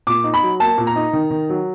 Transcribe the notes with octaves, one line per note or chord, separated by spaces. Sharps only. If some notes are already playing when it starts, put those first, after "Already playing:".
A#2 D6
D#4
B5
F#3
A#3 A5
A#2
A#5
D#4
D#3
D#3
F#3